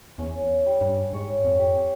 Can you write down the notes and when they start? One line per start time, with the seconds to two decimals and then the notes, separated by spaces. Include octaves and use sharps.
0.18 E2 C#4
0.66 G3
0.81 G2
1.13 G#2 C#5
1.44 F2
1.59 G4